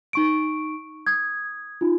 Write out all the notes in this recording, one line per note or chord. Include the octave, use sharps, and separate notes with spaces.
D#4 C#6 D7
D#6 G#6
D#4 F4